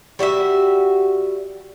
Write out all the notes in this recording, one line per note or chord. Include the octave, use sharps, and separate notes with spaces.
G3 F#4 G4 E5